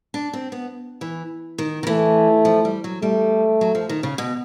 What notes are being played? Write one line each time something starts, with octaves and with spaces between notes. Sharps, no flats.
D4
C4
B3
E3
D#3
D#3
E3 A3
F3
G3
F#3
G3 A3
F#3
F3
D#3
C#3
B2